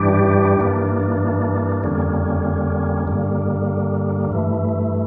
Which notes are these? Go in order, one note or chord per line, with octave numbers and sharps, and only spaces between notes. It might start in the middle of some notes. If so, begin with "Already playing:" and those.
Already playing: G2 E3 G3 D4 G4
G2 E3 A#3 D4
F2 D3 G3 A#3 C#4
G2 D3 G3 A#3
G2 E3 A3